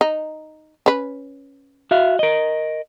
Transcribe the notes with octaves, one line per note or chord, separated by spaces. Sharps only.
D#4
C#4 B4
F#4 E5 F5
A#4 D#5